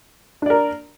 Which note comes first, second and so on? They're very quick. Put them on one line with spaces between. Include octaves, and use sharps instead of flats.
D4 D5 A#4